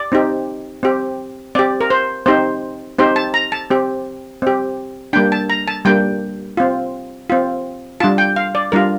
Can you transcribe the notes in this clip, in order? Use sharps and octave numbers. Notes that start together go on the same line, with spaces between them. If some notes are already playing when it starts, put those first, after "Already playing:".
Already playing: D5
C4 D#4 G4
C4 G4
C4 G4 D5
A#4
C5
C4 D#4 G4 C5
C4 D#4 G4 C5
A5
A#5
A5
C4 G4
C4 G4
G3 A#3 D4 G5
A5
A#5
A5
G3 A#3 D4 G5
C4 F4
C4 F4
G3 D4 F4 A5
G5
F5
D5
G3 D4 F4 A#4